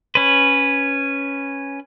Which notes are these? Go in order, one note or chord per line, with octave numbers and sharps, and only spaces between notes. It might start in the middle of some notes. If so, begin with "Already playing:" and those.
C#4 B4